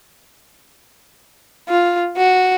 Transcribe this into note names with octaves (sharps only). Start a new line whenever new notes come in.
F4
F#4